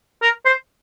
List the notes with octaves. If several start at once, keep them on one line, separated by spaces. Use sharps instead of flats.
A#4
C5